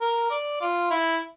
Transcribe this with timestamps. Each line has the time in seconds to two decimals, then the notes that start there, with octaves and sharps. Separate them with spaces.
0.01 A#4
0.31 D5
0.61 F4
0.91 E4